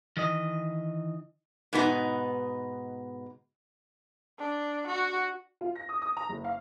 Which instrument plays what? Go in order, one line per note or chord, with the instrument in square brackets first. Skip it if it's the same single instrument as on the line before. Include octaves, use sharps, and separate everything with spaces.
[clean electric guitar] D#3 E3 D#5
[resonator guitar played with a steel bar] G#2 B2 B3 D#4
[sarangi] D4
F#4
[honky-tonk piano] F4
A#6
D#6
D#6
A#5
F#1
F5